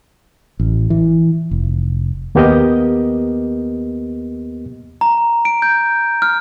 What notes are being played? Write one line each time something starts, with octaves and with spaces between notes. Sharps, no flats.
A1
E3
F1
D#2 A#3 B3 G4 A#4 D#5
A#5
D7
G6
F6